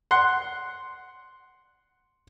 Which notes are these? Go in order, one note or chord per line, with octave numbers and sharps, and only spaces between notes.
F#5 C6